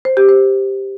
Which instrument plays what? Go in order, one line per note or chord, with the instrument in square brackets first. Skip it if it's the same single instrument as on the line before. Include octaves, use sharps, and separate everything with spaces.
[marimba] C5
G4
C5